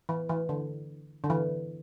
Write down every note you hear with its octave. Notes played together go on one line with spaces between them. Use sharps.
E3
E3
D3
D3
E3